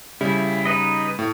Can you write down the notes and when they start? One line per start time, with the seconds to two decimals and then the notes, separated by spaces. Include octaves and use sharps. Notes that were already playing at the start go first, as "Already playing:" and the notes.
0.21 C#3 G3 E4
0.65 D#4 B4 D#5
1.19 A2